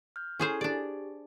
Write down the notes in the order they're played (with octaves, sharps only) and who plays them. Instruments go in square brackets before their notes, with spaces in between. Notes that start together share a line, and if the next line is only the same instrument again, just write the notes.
[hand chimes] F6 G6
[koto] C#4 G#4 C5 [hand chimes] E4 A4 G#5
[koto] D4 D5 [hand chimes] G4